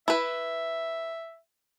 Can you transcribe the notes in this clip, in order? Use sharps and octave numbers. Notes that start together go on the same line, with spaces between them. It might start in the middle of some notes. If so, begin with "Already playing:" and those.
E4 B4 E5